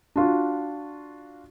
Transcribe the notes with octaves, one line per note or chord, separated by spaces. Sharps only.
D4 F4 F#4